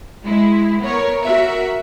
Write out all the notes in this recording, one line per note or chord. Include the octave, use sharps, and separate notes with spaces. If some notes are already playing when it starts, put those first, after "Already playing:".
G#3 E4
B3 A#4 C#5
F#4 A#4 E5